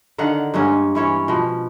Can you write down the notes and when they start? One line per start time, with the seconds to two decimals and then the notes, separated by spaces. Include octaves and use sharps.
0.18 D3 D#3 F5 F#5
0.54 G2 G#3 A#3 C#4
0.95 E3 C#4 C#5
1.28 B2 F3